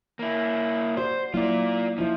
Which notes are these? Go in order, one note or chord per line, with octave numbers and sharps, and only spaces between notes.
A#3 E4
F#4 C5 D5
F#3 A#3 E4 F4 D5
F3 D#4 E4